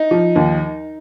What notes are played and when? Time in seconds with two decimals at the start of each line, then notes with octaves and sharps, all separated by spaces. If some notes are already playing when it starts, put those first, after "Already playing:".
Already playing: D#4
0.11 F3
0.36 D#2